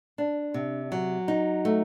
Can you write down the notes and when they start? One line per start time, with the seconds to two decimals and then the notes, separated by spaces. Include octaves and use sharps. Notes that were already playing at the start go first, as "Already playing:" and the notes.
0.18 D4
0.54 C3
0.92 F#3
1.28 D#4
1.65 A3